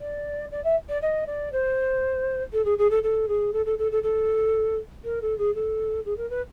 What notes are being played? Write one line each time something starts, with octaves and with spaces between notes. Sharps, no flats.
D5
D5
E5
D5
D#5
D5
C5
A4
G#4
G#4
A4
A4
G#4
A4
A4
A4
A4
A4
A#4
A4
G#4
A4
G#4
A#4
B4